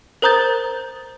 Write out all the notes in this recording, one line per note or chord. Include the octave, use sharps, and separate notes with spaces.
A#4 C5 A#5 D#6 G6 A6